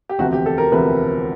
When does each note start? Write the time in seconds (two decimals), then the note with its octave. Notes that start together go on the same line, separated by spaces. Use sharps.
0.09 G4
0.19 E1 D2 C3 F3 F#4
0.33 G4
0.46 A4
0.58 A#4
0.72 E1 D2 C3 F3 B4